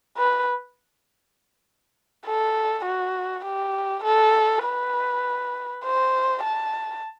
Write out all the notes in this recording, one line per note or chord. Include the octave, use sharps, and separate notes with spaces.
B4
A4
F#4
G4
A4
B4
C5
A5